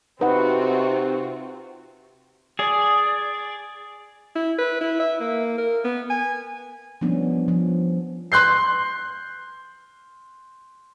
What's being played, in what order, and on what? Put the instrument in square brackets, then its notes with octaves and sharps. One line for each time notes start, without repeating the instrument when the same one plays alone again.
[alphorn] C3 [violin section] C4 F4 F#4 [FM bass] D#4 [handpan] B4 F#5
[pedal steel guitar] G#4 D5
[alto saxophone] E4
B4
E4
E5
A#3
A#4
B3
G#5
[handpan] F3 G3 B3 C#4 D4
F3
[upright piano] C6 F#6 G6 C7